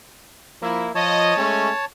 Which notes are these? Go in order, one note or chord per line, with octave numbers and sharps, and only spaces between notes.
F3 A#3 E4
F3 C#5 D#5 A5
G#3 A3 C#4